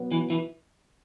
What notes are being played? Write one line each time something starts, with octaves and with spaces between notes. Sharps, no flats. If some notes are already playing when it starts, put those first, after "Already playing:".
Already playing: B2 F#3 B3
E3
E3